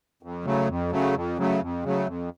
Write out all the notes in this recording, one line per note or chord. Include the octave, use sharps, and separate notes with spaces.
F2
C#3 F#3 A3
F2
C#3 F#3 A3
F2
C#3 F#3 A3
F2
C#3 F#3 A3
F2